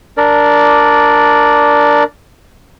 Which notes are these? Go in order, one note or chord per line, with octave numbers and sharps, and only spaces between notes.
D4 A#4 D5